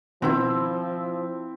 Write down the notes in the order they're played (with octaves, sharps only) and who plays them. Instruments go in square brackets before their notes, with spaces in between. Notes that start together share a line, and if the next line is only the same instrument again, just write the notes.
[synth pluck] B2 D#3 [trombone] F3 [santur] C4 E4